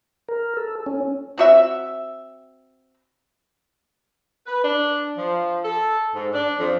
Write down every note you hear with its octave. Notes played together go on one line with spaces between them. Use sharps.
A#4
A4
C#4
C4 F#4 E5
B4
D4
F3
A4
G#2
D4
F2